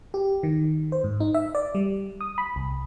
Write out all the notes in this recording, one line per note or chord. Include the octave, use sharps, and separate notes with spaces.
G4
D#3
C5
G#2
D#4
E5
D5
G3
D#6
B5
C2